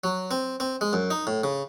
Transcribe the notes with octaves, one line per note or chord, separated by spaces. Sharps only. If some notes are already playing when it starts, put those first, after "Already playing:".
F#3
C4
C4
G#3
F#2
D#4
A2
C#3